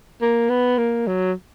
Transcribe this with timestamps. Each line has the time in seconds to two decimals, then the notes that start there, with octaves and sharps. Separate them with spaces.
0.22 A#3
0.50 B3
0.78 A#3
1.07 F#3